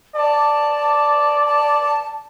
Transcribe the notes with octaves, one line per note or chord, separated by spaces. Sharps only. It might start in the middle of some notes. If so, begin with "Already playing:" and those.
D5 A5
A5